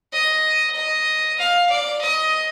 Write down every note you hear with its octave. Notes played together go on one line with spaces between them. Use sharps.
D#5
D#5
F5
D5
D#5